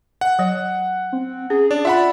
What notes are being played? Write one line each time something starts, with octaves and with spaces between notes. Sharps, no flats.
F#5
F#3 C#5
C4
C#4 G#4
D4 D5
F4 E5 F#5 B5